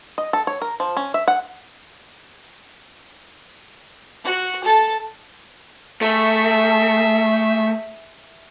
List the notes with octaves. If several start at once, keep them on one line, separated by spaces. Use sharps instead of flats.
D#5
A4
C#5
A#4
F3
C#4
E5
F#5
F#4
A4 A5
A3 G#4 E5